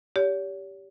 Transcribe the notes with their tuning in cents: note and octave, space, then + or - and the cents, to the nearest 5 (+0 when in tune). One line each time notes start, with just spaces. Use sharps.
G4 +0 C#5 +45